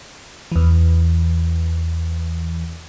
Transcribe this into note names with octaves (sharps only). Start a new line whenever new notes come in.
E2 E3